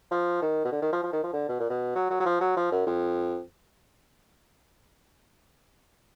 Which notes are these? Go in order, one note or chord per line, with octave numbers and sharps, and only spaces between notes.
F3
D#3
B2
D3
D#3
F3
F3
D#3
F3
D3
B2
A#2
B2
F#3
F#3
F#3
F3
F#3
F3
F#2
F2